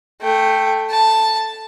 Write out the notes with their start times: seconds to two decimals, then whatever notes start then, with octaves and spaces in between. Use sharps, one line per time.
0.21 A3 G5
0.90 A5